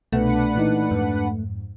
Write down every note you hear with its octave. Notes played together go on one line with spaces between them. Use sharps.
C2 B2 A3 D4 B4 F#5
A#2 E3 D#4
F2 G#2